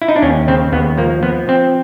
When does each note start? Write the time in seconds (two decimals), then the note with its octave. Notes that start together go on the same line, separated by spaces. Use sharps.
0.02 E4
0.08 D#4
0.16 D4
0.22 D#2 C#4
0.48 C#3 C4
0.72 D#2 B3
0.98 F3 A#3
1.22 F3 B3
1.48 F3 C4